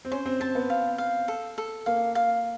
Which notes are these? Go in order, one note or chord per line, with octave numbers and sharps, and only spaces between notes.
C4
C#4 C5
C4
C4 A5
B3
F5
F5
A4
A4
A#3 F5
F5